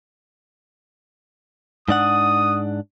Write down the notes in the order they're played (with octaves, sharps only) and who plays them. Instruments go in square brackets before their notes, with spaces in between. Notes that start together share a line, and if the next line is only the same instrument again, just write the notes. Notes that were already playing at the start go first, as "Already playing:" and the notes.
[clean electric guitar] G#2 D4 F#5 [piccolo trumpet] D#6